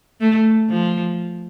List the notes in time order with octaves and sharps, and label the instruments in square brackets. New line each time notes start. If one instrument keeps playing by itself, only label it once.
[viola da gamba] A3
F3